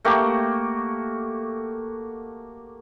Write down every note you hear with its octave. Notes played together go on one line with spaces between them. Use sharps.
A3 A#3 F#4 G4